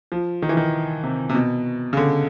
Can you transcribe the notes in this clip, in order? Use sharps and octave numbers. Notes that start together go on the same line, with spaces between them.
F3
D#3
E3
D#3
C3
C3
B2
C#3
D3